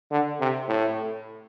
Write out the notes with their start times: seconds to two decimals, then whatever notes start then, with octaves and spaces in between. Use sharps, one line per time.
0.11 D3
0.41 C3
0.68 A2